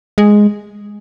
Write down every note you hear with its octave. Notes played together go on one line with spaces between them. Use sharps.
G#3